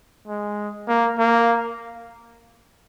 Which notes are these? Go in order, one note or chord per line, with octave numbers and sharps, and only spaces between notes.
G#3
A#3
A#3